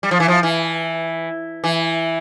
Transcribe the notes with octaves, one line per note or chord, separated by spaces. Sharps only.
G3
F3
E3
F3
E3
E3